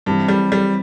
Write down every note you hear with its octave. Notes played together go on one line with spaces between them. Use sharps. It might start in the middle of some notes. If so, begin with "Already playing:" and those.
G2 E3 C4 G4
G3
G3